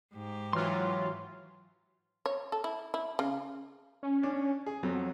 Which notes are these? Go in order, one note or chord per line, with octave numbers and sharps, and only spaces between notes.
G#2 G4
E3 F#3 F4 C6 F6
C#5
A4
E4
E4
C#3
C#4
D4
G#4
F2 F#3